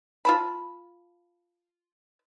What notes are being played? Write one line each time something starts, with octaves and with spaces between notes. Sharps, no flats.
F4 A5 B5